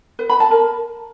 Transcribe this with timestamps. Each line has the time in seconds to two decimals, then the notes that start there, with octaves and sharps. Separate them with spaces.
0.19 B4
0.30 B5
0.40 A5
0.51 A#4